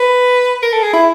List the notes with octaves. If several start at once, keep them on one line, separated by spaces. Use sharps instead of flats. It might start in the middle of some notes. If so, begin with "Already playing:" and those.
Already playing: B4
A#4
A4
G#4
E4